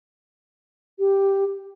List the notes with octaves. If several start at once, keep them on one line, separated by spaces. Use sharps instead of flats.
G4